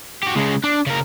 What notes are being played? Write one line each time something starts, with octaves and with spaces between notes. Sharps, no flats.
F#4 G4
C#3 G#3
D4
C#3 A#4